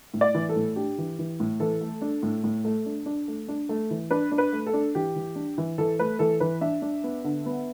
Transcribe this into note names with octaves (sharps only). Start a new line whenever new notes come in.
A2
D5
E3
A4
A2
D4 G4
E3
E3
A2
E3 A4
A3
D4
A2
A2
A3
D4
D4
A3
D4
A3
E3
D4 B4
D4
B4
A3
A4
D4
E3 G4
E3
D4
E3
E3 A4
A3 B4
E3 A4
E3 B4
D4 E5
D4
B3
D3
B3